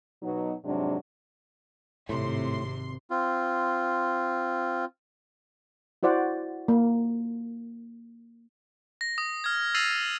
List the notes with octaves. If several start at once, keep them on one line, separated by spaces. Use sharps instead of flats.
B2 F#3 D#4
F2 G#2 C3 F#3 D4
G#1 A2 C3 C6
C4 F4
E4 F#4 C5 D5 F#5
A#3
A#6
D#6
F6 G#6
E6 A6 A#6 C7 D#7 F7